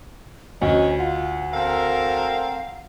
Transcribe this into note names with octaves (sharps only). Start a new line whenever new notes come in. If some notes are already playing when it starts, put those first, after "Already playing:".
D2 C#4 D#5
F4 F#5
C4 A4 A#4 F5